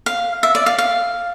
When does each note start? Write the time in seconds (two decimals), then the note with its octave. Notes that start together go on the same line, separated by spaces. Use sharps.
0.06 F5
0.43 E5
0.55 D5
0.66 F5
0.78 F5